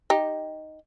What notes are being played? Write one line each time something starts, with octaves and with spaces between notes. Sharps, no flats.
D#4 G4